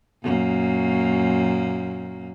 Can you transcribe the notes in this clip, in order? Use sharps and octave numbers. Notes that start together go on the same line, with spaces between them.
F#2 A#2 A#3